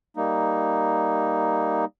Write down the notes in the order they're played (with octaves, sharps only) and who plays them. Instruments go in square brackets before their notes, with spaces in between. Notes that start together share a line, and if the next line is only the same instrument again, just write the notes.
[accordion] G3 A#3 D#4